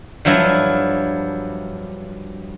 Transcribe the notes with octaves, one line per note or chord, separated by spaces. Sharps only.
G2 F3 F#3 E4